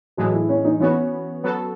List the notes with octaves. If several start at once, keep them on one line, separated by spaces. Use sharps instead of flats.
A2 E3 F#3 G#3
E4
C#4
D#4
E3 B3 C#4 F#4
F#3 B3 F#4 A4